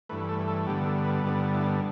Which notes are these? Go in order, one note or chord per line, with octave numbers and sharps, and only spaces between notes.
G2 E3 A3 B4
A4
A4
G2 D3 G3 B3 G4
A4
B4
G2 D3 G3 B3 B4
E4
D4